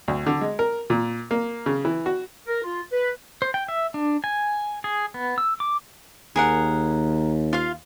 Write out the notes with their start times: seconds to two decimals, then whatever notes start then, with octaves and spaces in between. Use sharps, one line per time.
0.08 D2
0.26 D3
0.41 G#3
0.59 A#4
0.90 A#2
1.31 A#3
1.66 C#3
1.85 E3
2.06 F#4
2.47 A#4
2.64 F4
2.92 B4
3.42 C5
3.54 G5
3.68 E5
3.94 D4
4.24 G#5
4.84 G#4
5.14 B3
5.38 E6
5.60 D6
6.36 D#2 G#4 A#4 F#5
7.53 F4 F5